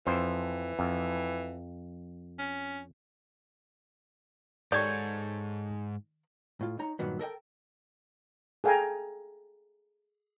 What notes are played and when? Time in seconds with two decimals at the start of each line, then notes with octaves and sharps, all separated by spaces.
0.07 F2 E3 C5
0.79 F2
2.39 C#4
4.72 G#2 D#3 G4 A4 C#5 D5 G6 G#6
6.61 A2 F4
6.79 D#4 C#5 A#5
6.99 G2 A#2 D#3 F#3 B3
7.19 A4 A#4 D#5 G5
8.64 G#4 A4 F5 G5 G#5 A#5